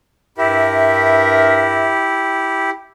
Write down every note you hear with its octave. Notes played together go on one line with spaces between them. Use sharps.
G2 E4 G4 A#4 E5